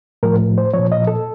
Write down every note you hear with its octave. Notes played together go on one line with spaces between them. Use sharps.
A2 F3 A#4
C5
A#2 F3 C#5
D#5
A4